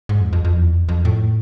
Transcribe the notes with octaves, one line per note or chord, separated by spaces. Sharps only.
G#2
F2
F2
F2
E2
F2
F2
A2